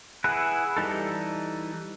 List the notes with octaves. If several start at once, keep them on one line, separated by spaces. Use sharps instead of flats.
E4 G#4 B4 F#5
E3 G3 D#4 A4